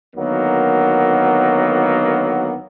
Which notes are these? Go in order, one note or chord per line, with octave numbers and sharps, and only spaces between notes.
D2 D#3 F#3 A#3 B3